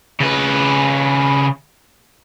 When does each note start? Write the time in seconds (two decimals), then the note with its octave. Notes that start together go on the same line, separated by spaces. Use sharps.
0.20 C#3 B4